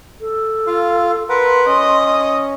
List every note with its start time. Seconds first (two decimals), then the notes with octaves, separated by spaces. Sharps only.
0.21 A4
0.67 F4 F5
1.29 A#4 B4 F#5 C6
1.66 C#4 D#5